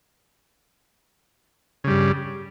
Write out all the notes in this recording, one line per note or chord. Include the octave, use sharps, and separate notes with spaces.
G2 C#3 G3